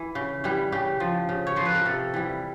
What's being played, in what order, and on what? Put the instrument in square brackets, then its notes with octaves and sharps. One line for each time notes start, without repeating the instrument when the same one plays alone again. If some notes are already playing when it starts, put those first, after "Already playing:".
Already playing: [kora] E3
C#3
E3 G3
C#3 G4
F3
C#3
C#5
F3 C5
B4
A#4
C3 A4
E3 G3